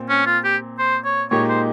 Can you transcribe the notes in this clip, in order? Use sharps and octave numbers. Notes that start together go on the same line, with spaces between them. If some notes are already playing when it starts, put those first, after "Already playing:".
Already playing: A#2 C4
C#4
F4
G4
C5
C#5
A#2 G#3 D#4 G4 C#5
C5